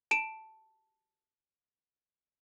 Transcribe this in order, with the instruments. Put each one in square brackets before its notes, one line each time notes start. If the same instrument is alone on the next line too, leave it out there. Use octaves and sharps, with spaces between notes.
[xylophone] A5 D7 E7